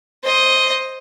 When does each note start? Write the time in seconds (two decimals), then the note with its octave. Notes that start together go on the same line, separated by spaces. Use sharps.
0.24 C5 D#5